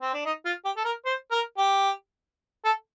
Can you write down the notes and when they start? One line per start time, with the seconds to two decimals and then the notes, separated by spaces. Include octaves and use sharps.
0.01 C4
0.14 D4
0.26 D#4
0.45 F4
0.65 G4
0.77 A4
0.85 A#4
1.06 C5
1.31 A#4
1.58 G4
2.65 A4